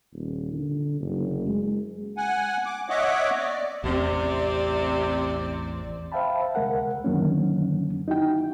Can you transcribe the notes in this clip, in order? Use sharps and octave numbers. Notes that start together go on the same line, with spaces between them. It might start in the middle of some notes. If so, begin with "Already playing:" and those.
D#1
D3
F#1
G#3
F#5 G#5
D6
C#5 D#5 E5 F#5 D6
D5
A1 E2 C3 C4 C#4 D5
C5 E5 F5 G5 A5 B5
D2 C3 G#3 A#4 F#5
F#2 D3 D#3 F#3 A#3 C#4
D#4 E4 F#4 G5